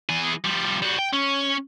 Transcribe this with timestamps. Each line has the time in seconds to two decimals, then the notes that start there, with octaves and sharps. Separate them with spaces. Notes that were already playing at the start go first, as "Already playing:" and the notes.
0.09 E3 G#4
0.44 F3 G3
0.82 G3 F#4
0.99 G5
1.13 C#4